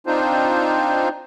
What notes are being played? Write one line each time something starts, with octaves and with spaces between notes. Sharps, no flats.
C4 D4 D#4 F4 C5